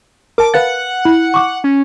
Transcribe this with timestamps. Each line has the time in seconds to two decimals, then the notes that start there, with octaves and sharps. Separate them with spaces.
0.38 A#4 A5 D6
0.54 B4 F5 F#5 A6
1.05 E4
1.34 C#6 D6
1.64 C#4